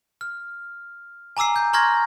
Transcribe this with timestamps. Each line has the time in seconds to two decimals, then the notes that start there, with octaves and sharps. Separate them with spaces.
0.21 F6
1.37 G#5 A#5 D6 E6 C7
1.56 G6
1.73 A#5 C6 C#6 F6 G#6 A#6